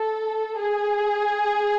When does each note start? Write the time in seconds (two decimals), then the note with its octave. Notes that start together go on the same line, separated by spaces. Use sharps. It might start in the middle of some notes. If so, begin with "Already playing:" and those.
Already playing: A4
0.58 G#4